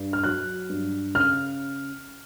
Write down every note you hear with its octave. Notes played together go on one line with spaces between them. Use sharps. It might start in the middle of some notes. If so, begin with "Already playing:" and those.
Already playing: G2
F6
F#3 F#6
G2
C#3 F6